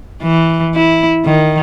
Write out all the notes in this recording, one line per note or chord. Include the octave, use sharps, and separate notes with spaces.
E3
E4
D#3